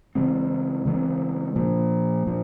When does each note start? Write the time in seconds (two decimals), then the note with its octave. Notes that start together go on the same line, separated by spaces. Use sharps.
0.15 C#3 E3 G#3 C4
0.86 C#3 E3 G#3 C4
1.56 A#2 F3 A#3
2.27 A#2 F3 A#3